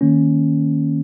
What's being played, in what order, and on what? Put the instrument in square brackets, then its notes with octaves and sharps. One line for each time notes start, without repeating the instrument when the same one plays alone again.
[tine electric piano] D#3 A#3 C#4